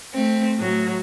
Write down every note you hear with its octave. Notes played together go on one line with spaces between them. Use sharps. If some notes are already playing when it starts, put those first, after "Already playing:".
A3 C4
A2 F#3